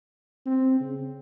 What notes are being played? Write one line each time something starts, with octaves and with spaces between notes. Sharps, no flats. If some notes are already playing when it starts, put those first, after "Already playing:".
C4
C#3